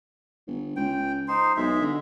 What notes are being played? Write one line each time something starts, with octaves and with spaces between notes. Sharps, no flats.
G1
C#2 G5
D#4 C5 C6
B1 G#3 E5
D3